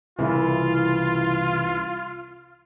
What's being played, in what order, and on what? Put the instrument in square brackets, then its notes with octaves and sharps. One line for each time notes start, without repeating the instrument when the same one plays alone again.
[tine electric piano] C2 E3 [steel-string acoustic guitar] C#3 E4 [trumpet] F4